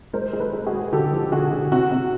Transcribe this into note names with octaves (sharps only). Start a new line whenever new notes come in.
G#3 A#4 C5
G#3
A4 B4
G#3
F#4 G#4
G#3
D3 G4 A4
F3
D3 F#4 G#4
D3
C3 F#4
C3